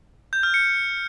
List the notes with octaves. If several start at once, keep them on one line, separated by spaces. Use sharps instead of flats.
G6
F6
C#7